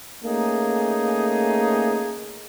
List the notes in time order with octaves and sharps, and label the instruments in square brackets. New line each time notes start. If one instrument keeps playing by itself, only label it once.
[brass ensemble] A3 A#3 C#4 D#4 G#4